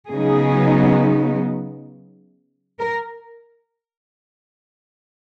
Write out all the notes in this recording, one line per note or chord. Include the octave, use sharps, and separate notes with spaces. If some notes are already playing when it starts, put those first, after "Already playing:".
C#3 F#3 B3 D#4 G#4
A#4